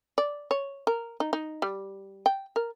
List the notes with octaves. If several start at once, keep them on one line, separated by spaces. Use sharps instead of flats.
D5
C#5
A#4
D#4
D#4
G3
G5
A#4